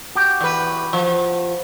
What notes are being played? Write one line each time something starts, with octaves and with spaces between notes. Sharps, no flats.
F#4 G4
E2 B4
F3